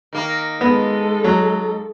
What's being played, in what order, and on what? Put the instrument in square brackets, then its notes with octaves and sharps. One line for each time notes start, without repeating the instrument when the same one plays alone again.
[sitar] D#3 A#3
[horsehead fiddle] G#3 A4 [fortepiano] B3
[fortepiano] F#3